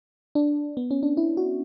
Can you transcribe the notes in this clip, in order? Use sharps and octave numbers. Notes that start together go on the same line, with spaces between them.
D4
B3
C#4
D4
E4
F#4